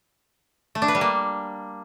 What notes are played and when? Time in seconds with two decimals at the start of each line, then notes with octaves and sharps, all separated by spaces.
0.75 A3
0.82 D4
0.88 B4
0.95 G3
1.01 A#3